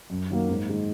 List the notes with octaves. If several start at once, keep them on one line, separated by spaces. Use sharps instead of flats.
F#2
D#3 F#3 A#3
G#2
D#3 G#3 D#4